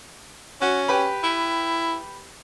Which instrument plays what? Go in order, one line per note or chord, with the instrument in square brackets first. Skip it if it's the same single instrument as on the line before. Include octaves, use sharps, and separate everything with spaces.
[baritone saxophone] C#4 [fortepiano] F#4
[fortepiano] G4 B4 B5
[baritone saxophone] E4